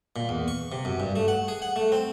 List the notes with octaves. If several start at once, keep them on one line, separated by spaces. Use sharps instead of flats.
A#2
E2
C#6
C3
F#2
G2
A3
F#5
G#4
F#5
A3
C4